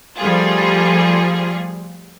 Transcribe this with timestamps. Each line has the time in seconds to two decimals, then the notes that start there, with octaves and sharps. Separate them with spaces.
0.18 F3 G3 A3 F4 G#4